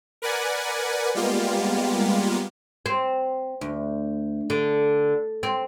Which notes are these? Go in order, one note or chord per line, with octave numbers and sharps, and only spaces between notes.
A#4 B4 D5 F#5 G#5
G3 G#3 A#3 B3 F4 G4
C4
D2
D3
C4